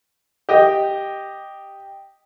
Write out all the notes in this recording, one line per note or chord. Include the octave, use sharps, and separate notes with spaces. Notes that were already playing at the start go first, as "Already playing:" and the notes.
G4 D#5